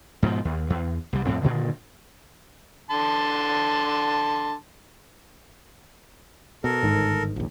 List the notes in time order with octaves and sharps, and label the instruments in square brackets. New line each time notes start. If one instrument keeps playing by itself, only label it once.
[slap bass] G#2 B2 D#3 F3
D#2
E2
C2 G3
F2 A2 C4
G2 A#2 D3 D#3
[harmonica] D3 A5 C6
[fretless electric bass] B2 [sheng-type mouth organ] A4 A#4
[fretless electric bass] G1 D#3 [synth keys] G#2
[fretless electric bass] A#1 D#2